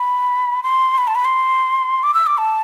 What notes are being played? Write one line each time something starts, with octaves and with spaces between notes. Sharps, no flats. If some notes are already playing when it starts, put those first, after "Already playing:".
Already playing: B5
C6
B5
A5
B5
C6
D6
E6
D6
A5